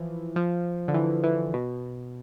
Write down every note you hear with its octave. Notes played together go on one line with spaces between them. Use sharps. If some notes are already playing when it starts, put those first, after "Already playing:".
Already playing: E3 F3
F3
D3
E3
E3
B2